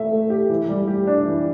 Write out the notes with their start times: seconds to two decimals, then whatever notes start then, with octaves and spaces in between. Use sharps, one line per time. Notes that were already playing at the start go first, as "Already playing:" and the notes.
Already playing: A3 E5
0.11 A3
0.30 G4
0.49 E3
0.69 G3
0.87 G4
1.07 D4
1.26 E3